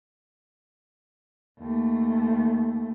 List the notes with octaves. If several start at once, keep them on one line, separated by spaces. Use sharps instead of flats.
D#2 A3